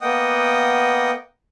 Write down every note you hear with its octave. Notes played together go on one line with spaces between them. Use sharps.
A#3 B3 D#5 F#5 G5 D#6